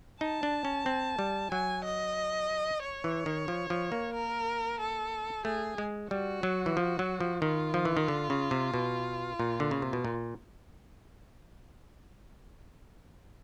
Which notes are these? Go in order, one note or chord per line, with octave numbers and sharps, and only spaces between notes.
D#4 A5
D4
C#4
C4
G3
F#3 G#5
D#5
C#5
E3
D#3
F3
F3
A#3
A#4
A4
A3 G#4
G#3
G3 F#4
F#3
E3
F3
F#3
F3
D#3 F4
F3
E3
D#3
D3
C#3
C3
B2
A#2
D3
C#3
C3
B2
A#2